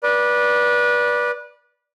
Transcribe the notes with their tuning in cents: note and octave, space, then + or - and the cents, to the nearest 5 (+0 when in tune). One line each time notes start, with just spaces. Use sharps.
B4 -25 D5 +0